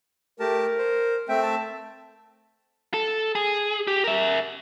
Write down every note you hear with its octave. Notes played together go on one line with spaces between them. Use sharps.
A3 G4 A#4 A5
C5
A3 C4 E5 G5
A5
A4
G#4
G4
A#4 E5